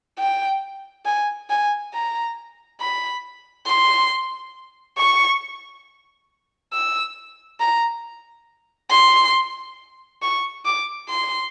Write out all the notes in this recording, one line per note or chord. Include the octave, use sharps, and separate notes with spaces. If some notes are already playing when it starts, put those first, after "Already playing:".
G5
G#5
G#5
A#5
B5
C6
C#6
E6
A#5
C6
C#6
D6
C6